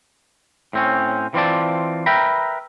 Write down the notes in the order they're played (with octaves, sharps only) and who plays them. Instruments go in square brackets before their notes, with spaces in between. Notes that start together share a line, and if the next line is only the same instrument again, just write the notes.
[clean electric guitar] A2 C4 C#4
E3 C4 F4 D5 A5
A#4 B4 E5 G5 A#5 B5